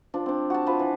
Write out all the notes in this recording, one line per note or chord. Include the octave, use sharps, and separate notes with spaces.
F3 D4
C4 D4
F#4 A5
F3 B4
E3